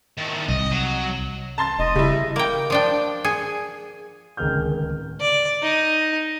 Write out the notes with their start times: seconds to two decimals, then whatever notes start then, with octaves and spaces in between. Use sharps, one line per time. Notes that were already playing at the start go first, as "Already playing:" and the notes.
0.17 A2 D#3
0.49 C2 D#5
0.72 F#3
1.58 A5 C6 A6
1.79 F1 D#5
1.96 C#3 G3 E4
2.36 A#3 G5
2.70 F3 D4 G5
3.24 G#4
4.37 D1 C#2 D#3 G#4 F6 G6
5.20 D5
5.62 D#4